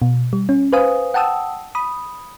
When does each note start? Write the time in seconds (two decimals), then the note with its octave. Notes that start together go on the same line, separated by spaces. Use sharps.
0.02 B2
0.33 G3
0.49 C#4
0.73 B4 C5 F5 G#5 D#6
1.14 F#5 G5 A5 D#6 E6
1.75 B5 D#6